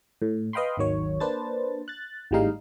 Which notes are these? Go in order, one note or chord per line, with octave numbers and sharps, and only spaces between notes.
A2
B4 D#5 F5 G5 B5 C6
G#1 D#2 D#3 F#3 C#5
A#3 D4 B4 C5 A5 A6
F#6 A6
G#1 A2 G3 G#3 D#4 F5